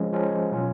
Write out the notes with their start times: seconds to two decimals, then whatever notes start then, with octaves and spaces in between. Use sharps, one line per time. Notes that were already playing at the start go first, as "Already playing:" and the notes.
Already playing: F3 G#3 C#4
0.13 F3 G#3 C#4
0.52 B2 F#3 C#4 F4